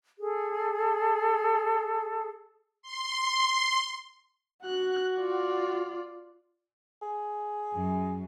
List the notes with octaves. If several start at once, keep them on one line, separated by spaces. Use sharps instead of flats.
G#4 A4
C6
F#4 F#6
F4 D5
G#4
F#2